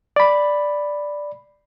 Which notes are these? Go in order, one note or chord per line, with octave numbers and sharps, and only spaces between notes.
D5 B5